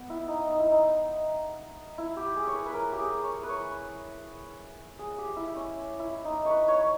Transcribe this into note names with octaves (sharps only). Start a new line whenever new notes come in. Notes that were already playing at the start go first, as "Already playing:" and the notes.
Already playing: B3
E4
D#4
D#4
E4
D#4
E4
G4
G#4
C#5
B4
B4
A#4
G4
G#4
C#5
B4
C#5
G#4
G4
E4
C#4
E4
D#4
B4 C#5
C#5